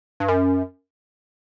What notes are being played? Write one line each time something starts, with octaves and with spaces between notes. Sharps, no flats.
G2
F#2